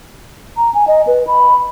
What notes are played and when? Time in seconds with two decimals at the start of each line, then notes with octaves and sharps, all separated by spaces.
0.57 A#5
0.74 G#5
0.88 D#5
1.07 B4
1.27 B5